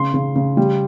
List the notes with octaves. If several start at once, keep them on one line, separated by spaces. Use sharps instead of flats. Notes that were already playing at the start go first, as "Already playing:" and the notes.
Already playing: C#3 C6
C#3
C#3
G3